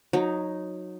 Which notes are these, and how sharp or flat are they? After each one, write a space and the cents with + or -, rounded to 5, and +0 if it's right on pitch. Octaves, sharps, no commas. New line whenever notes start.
F#3 -20 D#4 +0